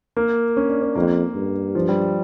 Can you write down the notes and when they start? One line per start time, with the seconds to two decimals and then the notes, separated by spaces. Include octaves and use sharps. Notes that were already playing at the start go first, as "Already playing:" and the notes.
0.17 A#3
0.57 C#4
0.70 D4
0.82 C#4
0.96 F2 A#3
1.35 G2
1.75 F3
1.89 G3